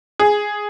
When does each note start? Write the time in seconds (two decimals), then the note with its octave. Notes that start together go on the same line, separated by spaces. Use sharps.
0.20 G#4